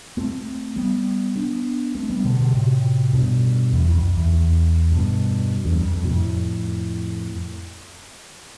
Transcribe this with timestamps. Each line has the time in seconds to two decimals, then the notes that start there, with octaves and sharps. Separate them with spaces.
0.17 A3 C4
0.76 G3 B3
1.36 B3 D4
1.95 A3 C4
2.09 G3 B3
2.24 B2 D3
2.39 B2 D3
2.54 A2 C3
3.13 G2 B2
3.72 E2
3.88 F2
3.96 E2
4.02 F2
4.17 E2
4.33 E2
4.91 G2 B2
5.65 E2 G2
5.80 F2
5.95 F2
6.04 B2
6.10 F2 A2